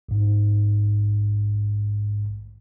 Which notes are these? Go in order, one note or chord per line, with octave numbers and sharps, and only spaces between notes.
A#1 G#2